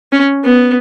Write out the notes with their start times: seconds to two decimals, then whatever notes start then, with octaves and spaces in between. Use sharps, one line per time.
0.12 C#4
0.44 B3